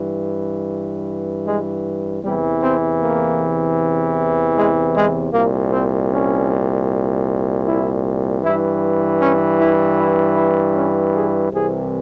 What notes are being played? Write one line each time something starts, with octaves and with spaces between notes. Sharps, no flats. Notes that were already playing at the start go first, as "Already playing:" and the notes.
Already playing: G2 E3
G#3
E2 C3 E3 G3
C4
A#3
G#3
G#3
C2 A#2 A#3
C4
C#4
E4
G2 E3 E4
C#4
E4
E4
E4
C#4
G#4
C2 C3 E3 G#4